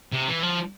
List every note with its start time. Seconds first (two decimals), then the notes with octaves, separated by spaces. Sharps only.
0.12 C3
0.28 E3
0.42 F3